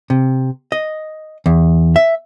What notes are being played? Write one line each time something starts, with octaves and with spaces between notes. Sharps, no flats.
C3
D#5
E2
E5